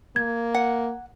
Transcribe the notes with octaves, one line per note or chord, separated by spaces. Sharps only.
A#3 G#6
F#5